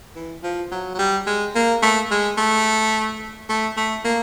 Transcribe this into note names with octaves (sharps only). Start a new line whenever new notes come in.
E3
F3
F#3
F#3
G3
G#3
A#3
A3
G#3
A3
A3
A3
A#3